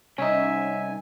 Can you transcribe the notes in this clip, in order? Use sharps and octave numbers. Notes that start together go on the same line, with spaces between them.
C2 C#4 D#4 E5 G#5